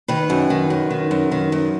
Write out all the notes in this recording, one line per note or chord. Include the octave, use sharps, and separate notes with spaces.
D#3 B4
F#2
D#3
F#2
D#3
F#2
D#3
F#2